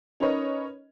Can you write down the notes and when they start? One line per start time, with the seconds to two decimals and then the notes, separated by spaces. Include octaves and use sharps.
0.20 C#4 D#4 A#4 B4 C#5 D#5